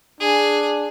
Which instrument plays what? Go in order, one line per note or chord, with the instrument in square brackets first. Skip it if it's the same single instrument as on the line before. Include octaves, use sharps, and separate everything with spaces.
[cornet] D4 [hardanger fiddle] G#4